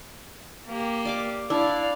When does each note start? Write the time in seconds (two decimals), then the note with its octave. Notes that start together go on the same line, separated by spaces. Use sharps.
0.67 A#3 G4
1.05 D5 F5 D6
1.50 D4 E4 D5 F5